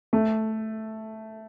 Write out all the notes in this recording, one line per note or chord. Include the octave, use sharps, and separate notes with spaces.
A3